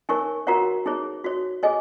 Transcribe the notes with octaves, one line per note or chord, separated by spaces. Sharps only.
D#4 A#4 C#5 G#5 C#6
F#4 A#4 C#5 F#5 A#5
D#4 G#4 C#5
F#4 C#5
G#4 C#5 D#5 G#5